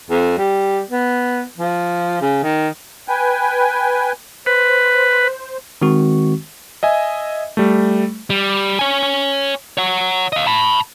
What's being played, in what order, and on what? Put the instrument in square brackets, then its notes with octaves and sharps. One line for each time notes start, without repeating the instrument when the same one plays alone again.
[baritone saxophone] F2
G3
B3
F3
C#3
D#3
[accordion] B4 G5 G#5
[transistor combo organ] B4 [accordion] C5
[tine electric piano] D#3 G#3 C4 F#4 C#6
[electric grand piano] D#5 E5 G#5
G3 A3
[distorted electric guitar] G3
C#5 G#5
C#5 F#5
D#5 F5
A5 B5